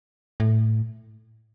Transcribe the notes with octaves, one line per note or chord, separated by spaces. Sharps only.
A2